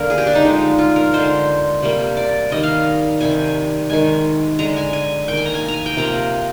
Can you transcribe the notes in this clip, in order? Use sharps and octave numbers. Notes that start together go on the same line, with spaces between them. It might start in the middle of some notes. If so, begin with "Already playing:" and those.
Already playing: D3 A#3 A#4
G#4
G4
D4
D#4
D3 F3 G#3
F4
A#4
D3 G#3 C5
C3 G3 A#3
D5
D#3 G3 A#3 D#5
F5
C3 D#3 G3 G#5
D#3 G#3 G#5
D3 G#3 A#5
G#5
G#5
D#3 A#3 G5
G#5
A#5
G#5
A#5
G#5
G5
C3 F3 A#3 A#5